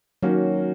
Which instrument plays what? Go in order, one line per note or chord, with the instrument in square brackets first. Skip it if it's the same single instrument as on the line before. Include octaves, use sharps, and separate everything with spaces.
[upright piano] D#3 A#3 C#4 F#4 [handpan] F#3